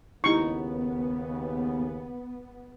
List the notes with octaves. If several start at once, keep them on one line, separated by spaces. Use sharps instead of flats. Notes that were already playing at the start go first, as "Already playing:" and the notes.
D#2 C#3 B3 D#4 E4 G4 C#6